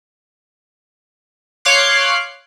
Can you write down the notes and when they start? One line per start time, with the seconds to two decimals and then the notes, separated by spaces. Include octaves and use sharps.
1.65 C#5 F5 C6 D6 F#6 C7